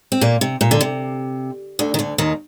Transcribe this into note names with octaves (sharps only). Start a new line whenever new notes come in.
C4
A#2 A#3
C3
A#2
D3
C3
D2 D3
D#3
D2 D3
D#2 D#3